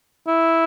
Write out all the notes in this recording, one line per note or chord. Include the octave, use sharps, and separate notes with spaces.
E4